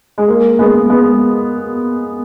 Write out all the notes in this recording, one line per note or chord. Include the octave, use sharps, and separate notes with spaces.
G#3
A#3
G#3 B3
G#3 B3